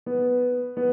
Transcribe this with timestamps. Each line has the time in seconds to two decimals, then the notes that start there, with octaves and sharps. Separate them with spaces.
0.06 B3
0.77 B3